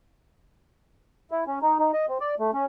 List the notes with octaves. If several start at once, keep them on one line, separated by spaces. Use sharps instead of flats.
E4
C#4
D#4
D#4
D#5
C4
D5
A3
C#4